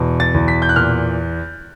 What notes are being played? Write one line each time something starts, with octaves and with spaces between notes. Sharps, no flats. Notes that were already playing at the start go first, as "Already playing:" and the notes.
Already playing: E2 B2
A6
E2
B6
G6
F#6
A#2 F6